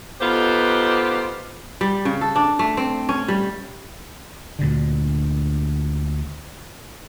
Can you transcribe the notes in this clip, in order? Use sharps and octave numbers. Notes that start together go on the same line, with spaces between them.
B3 D#4 F4 G4 A4 C5
G3
C#3
A4
D4
A3
C4
C#4
G3
D2 A#2 D3